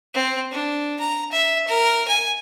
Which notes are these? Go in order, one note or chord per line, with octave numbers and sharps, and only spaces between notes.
C4
D4
A#5
E5
A#4
G#5